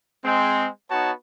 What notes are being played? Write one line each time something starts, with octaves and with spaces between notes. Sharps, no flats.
G#3 C4
B3 D#4 F#4 C#5 A5